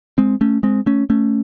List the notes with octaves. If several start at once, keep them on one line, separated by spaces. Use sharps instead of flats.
G#3 C4
A3 C#4
G#3 C4
A3 C#4
A3 C#4